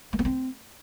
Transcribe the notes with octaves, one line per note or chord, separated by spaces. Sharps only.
A3
B3
C4